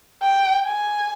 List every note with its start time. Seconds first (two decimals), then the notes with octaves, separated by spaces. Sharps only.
0.22 G5
0.66 G#5